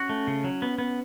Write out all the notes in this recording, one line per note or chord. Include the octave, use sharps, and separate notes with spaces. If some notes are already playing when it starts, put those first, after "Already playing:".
Already playing: C#4 F#4
A3
C#3
F#3
B3
B3